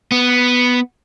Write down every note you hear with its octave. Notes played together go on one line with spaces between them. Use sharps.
B3